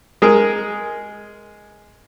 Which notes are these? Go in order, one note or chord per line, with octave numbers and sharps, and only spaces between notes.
G#3 G#4 A#4